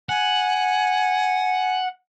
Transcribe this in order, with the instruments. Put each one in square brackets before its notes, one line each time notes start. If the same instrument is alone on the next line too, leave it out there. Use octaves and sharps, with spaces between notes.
[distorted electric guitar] F#5 [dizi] G#5